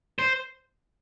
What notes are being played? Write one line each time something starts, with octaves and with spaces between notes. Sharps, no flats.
C5